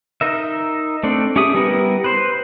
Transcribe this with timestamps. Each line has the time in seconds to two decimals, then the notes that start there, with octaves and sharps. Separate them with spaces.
0.21 D#4 A#4 E5
1.03 A3 C4 D4
1.36 C#4 G4 G#4 E5 D#6
1.54 G3 B3 E4 A#4
2.04 B4 C5